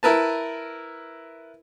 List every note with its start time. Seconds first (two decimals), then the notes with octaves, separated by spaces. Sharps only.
0.03 E4 A#4 B4 A5